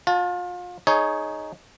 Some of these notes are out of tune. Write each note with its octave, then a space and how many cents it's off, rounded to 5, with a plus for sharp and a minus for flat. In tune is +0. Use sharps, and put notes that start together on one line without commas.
F4 +35 A5 -5
D#4 +0 G#4 +20 C#5 +0